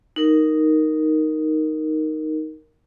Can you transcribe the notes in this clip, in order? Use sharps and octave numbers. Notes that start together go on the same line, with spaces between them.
D#4 A#4